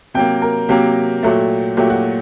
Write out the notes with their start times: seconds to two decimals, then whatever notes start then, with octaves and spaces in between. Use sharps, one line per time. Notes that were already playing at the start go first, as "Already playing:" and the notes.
0.14 C3 F#3 A#3 G5
0.42 A#4
0.69 C3 F#3 A#3 G4
1.23 A#2 F#3 A3
1.77 A#2 F#3 A3 G4
1.90 F#4